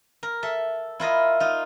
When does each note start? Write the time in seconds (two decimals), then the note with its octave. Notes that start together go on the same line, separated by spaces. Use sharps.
0.23 A#4
0.43 A4 E5
1.00 E4 F4 A#4 D#5
1.40 D#4 F4